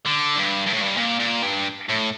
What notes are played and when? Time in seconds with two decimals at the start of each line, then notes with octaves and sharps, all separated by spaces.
0.06 D3
0.37 G2
0.67 G2
0.74 A2
0.81 G2
0.97 A#2
1.20 A#2
1.43 G2
1.89 A2